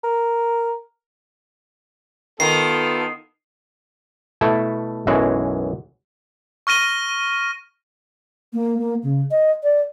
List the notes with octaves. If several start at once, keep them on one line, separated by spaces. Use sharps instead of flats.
A#4
D#3 B3 F4 A4 C7
B2 A3 E4 A4
B1 F#2 E3 G#3 F#4
C#6 F6 A#6 D#7 G7
A#3
A#3
C#3
D#5
D5